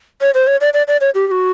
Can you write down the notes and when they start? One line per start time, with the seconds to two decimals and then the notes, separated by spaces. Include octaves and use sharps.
0.21 C#5
0.34 C5
0.47 C#5
0.61 D5
0.74 D5
0.88 D5
1.01 C#5
1.15 G4
1.27 G4
1.31 F#4